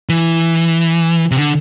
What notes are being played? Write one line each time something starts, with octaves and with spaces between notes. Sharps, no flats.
E3
C3
D3